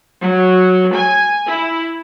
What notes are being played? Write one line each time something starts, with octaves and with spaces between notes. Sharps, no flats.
F#3
G#5
E4